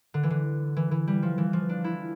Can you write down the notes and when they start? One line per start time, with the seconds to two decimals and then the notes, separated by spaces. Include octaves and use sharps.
0.14 D3
0.23 E3
0.30 D3
0.77 E3
0.91 E3
1.08 G3
1.23 F3
1.38 E3
1.53 F3
1.69 D4
1.84 E4